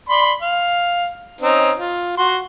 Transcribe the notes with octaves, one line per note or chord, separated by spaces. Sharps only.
D5 B5 C6
F5
C4 C#4 D#4
F4
F#4 C6